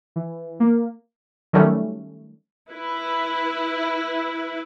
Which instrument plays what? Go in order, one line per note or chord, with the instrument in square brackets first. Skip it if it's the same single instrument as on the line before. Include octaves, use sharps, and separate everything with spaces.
[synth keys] E3
A#3
[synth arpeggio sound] D#3 F#3 G3 A3 C#4
[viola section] E4 B4